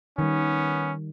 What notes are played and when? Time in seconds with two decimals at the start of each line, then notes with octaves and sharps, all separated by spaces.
0.18 D#3 G3 B3 C#4